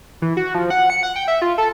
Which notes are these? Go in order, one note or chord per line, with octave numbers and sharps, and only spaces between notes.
E3
F#4
F3
F#5
C#7
F#5
G5
E5
F4
A4